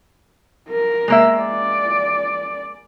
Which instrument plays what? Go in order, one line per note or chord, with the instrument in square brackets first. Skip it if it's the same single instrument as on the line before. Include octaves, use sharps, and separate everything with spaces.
[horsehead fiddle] A#4
[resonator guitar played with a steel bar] G#3 A#3 E5
[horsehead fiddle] D5